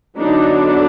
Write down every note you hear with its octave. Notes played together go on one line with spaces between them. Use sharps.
D3 F#3 B3 D4 D#4